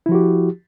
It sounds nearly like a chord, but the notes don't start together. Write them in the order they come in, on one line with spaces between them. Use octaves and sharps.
E4 F3 F#4 G4